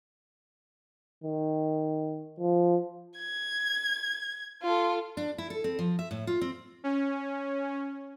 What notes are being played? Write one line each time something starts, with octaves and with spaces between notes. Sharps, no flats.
D#3
F3
G#6
F4 A4
D4
E4
A4
C4
F3
E5
A2
F4
C4
C#4